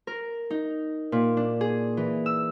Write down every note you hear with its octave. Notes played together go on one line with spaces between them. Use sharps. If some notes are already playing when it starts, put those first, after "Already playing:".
A#4
D#4
A#2
D4
G#4
E3
E6